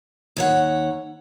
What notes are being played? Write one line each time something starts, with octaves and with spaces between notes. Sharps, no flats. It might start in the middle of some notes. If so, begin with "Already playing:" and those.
D#2 C#5 F#5